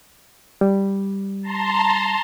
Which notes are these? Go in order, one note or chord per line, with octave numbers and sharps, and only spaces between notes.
G3
A5 A#5 C6